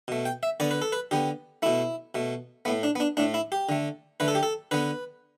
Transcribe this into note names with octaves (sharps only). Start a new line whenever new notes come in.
B2 A3
G5
E5
D3 B3 D5
B4
A4
B4
D3 B3 G4
B2 A3 E4
B2 A3
A2 A3 B3
D4
B3
D4
A2 A3 D4
E4
G4
D3 A3
D3 A3 B4
A4
G4
A4
D3 B3 B4